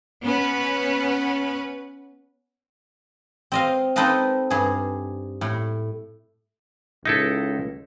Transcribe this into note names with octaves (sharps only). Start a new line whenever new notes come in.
B3 C#4 B4
C4 D#5 F5
C4 D#4 A4 B4 D#5 F5
G2 G#4
A2
C#2 D#4 E4 A4